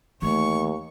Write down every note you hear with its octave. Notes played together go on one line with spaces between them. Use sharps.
D#2 E3 A3 C#6